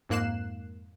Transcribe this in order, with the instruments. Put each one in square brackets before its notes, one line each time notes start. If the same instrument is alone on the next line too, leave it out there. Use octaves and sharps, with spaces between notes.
[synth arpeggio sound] F2 G#2 A#3 F#6 C7 E7